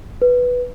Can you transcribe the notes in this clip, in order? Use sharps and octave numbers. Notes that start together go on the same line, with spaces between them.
B4